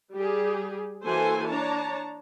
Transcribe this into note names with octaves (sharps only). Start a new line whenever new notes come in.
G3 G4 G#4
E3 A#3 F#4 A4 C5 G#5
D4 C#5 A5 A#5